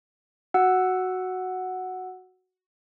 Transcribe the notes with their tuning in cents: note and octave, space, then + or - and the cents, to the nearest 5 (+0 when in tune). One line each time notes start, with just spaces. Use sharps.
F#4 +0 F#5 +0 E6 +0